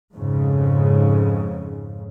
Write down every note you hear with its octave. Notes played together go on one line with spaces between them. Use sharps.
F2 G#2 C#3